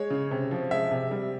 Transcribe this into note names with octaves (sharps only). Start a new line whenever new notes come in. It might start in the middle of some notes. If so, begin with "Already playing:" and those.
Already playing: G#3 C#5
C#3
C3
F3
G#3 E5
C3
G3